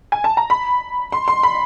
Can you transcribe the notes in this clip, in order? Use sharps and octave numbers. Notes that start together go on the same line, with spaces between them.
G#5
A5
A#5
B5
C6
C6
B5